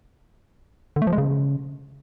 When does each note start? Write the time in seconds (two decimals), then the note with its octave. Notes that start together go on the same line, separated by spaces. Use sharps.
0.96 D3
1.02 A3
1.07 F3
1.13 G#3
1.18 C#3